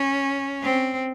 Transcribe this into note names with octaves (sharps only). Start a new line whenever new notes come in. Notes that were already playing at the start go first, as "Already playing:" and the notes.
Already playing: C#4
C4